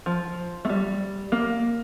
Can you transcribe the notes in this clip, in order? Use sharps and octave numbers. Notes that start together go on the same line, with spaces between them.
F3
A3
G3
A#3